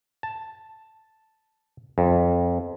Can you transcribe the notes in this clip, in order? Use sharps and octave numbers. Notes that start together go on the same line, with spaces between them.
A5
F2